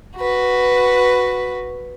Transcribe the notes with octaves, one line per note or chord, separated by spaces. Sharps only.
F#4 B4